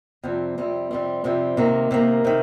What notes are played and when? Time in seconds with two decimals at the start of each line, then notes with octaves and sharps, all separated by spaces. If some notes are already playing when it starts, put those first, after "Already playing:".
0.24 F2 C3 G3 C4
0.58 F2 C3 G3 C4
0.91 F2 C3 G3 C4
1.24 F2 C3 G3 C4
1.57 C3 D#3 A#3
1.91 C3 D#3 A#3
2.24 C3 D#3